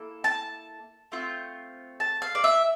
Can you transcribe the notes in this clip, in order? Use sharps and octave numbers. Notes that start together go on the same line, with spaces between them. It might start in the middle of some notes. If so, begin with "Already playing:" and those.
Already playing: A#3 E4 A4
A5
A3 C4 F4
A5
F5
D5
E5